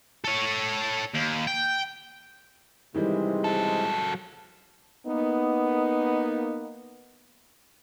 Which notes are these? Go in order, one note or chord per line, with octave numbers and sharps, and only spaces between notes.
A4 C#5
D#2
G5
G#2 C3 D#3 E3 G3 G#3
F#3 A4
A#3 B3 D#4